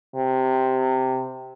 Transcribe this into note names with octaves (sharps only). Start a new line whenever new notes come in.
C3